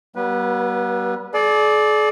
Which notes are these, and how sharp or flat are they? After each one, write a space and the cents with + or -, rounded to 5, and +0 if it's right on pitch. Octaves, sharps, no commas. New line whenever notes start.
G3 -45 B3 -40 B4 -15
G#4 +45 D5 +0